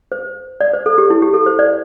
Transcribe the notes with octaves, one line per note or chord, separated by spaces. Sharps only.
C5
D5
C5
A4
G4
E4
G4
A4
C5
D5